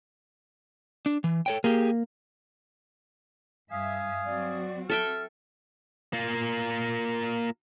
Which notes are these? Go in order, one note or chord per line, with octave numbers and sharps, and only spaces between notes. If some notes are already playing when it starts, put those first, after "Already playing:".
D4
E3
A4 C#5 G5
A#3 G4 G#4
G2 E5 F5 G#5 D#6
F#3 C4 F#4 D5
A4 E5 G5 F6
A#3 F4